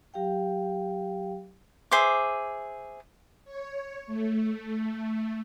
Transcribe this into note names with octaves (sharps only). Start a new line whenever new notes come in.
F#3 G4 F5 G5
G#4 C5 E5 D6
C#5
A3